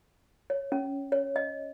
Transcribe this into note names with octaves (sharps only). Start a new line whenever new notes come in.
C#5
C#4
C#5
D#5